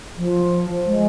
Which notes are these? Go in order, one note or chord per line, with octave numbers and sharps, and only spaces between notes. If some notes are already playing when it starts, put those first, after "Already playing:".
F3
G#3